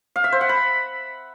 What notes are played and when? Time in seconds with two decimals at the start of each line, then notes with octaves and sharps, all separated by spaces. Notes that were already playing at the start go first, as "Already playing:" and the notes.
0.16 F5
0.24 E5
0.32 C5
0.41 F#5
0.49 B5